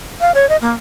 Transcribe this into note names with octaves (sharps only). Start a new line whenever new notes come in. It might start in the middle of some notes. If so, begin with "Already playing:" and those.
F5
C#5
D#5
A#3